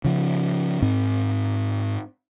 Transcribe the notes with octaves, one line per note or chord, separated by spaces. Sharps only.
C#3 F3
G#2 C4